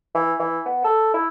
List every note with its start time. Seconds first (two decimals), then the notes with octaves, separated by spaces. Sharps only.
0.15 E3
0.40 E3
0.66 B3
0.85 A4
1.14 E4